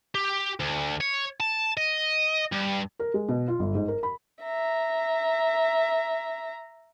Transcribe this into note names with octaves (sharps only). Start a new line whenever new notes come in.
G4
D2
C#5
A5
D#5
G2
A#4
G#3
B2
F4
G1
G#2
A#4
B5
E5 A#5